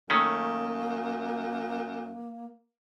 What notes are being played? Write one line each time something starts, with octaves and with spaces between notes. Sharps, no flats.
F#2 D#3 A3 A#3 C#4